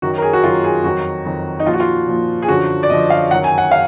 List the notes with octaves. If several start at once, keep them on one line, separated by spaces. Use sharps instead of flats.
F#2 D#3 F#3 F#4
A#4
G#4
F#4
F#2 D#3 F#3 F4
G#4
F2 D#3 F#3 F#4
F2 D#3 F#3
D#4
A#2 F3 F4
F#4
F4
A#2 F3
G#4
F#2 D3 F3 F#4
D5
F#2 D3 F3 D#5
F5
F#2 D#3 F#3 F#5
G#5
F#5
F5